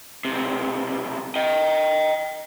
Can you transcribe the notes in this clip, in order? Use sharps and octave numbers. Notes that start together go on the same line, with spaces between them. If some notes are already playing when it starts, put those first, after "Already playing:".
B1 C3
D#5 G5